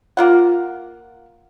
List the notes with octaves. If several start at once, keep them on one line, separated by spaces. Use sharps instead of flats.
A#3 F4 F#5